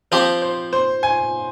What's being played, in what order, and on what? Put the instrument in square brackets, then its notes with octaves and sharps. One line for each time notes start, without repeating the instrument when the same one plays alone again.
[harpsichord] F3 C4 G4 [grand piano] C5
[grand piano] C5
C5
G#5